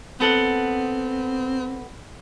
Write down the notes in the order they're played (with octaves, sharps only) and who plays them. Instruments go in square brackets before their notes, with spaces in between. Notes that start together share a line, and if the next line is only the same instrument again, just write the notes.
[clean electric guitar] B3 A4 F#5 [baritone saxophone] C4